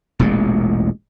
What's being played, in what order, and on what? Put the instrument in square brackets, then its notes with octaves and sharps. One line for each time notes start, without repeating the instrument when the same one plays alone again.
[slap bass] E1 A1 A#2 G#3